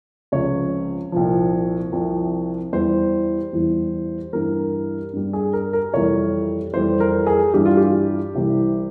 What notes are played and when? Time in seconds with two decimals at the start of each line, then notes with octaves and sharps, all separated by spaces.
0.32 C#2 C3 F3 C#5
1.12 C2 A#2 F3
1.92 C2 C3 F3
2.73 E2 E3 G3 C5
3.53 E2 E3 G3
4.33 G2 E3 G3 A#4
5.13 G2 G3
5.33 G#4
5.53 A#4
5.73 A#4
5.94 F2 C3 E3 G3 C#5
6.74 F2 E3 G3 C5
7.00 A#4
7.27 G#4
7.54 G2 E3 G3 G4
7.65 F4
7.77 G4
8.34 C2 C3 E3 G3